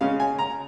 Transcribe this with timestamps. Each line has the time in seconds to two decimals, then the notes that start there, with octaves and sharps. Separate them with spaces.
0.01 C#3 G#3 C#4 F5
0.20 G#5
0.39 A#5